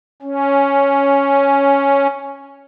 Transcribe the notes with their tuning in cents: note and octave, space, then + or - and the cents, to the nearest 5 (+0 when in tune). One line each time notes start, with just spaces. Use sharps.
C#4 +0